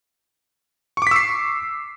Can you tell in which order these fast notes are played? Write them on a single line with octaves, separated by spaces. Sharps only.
C#6 D6 B6 E6 C7